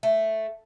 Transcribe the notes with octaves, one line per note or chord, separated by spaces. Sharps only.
A3